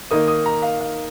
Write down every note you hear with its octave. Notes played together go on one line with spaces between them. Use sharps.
D#3 A#3 D#4 D#6
D#6
A#5
F5
F5